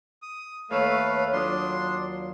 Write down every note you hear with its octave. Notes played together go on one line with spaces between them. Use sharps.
D#6
D#2 A3 B4 C#5 F5 E6
F#3 D4 F4 C6 D#6